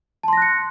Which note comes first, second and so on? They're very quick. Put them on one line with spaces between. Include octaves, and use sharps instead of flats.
A5 C6 A#6 F#6 C#7